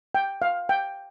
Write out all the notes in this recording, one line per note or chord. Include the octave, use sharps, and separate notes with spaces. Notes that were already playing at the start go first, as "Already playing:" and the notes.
G5
F5
G5